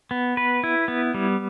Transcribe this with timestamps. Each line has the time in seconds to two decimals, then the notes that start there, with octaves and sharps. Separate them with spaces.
0.11 B3
0.37 B4
0.64 E4
0.88 B3
1.14 G3